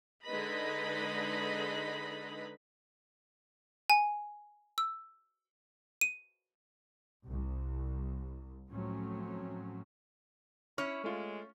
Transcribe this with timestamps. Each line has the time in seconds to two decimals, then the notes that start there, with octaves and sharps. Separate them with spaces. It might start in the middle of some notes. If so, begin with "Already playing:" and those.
0.25 D3 G#3 D#4 B4 D#5 B5
3.90 G#5
4.78 E6
6.01 D#7
7.27 C2
8.70 A2 F3 F#3 A3 C4 C#4
10.78 C#4 E4 C#5 F6
11.04 G#3 A3 F4